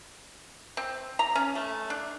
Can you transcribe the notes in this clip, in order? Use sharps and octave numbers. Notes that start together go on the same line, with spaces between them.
C4
A#5
C#4
A3
D4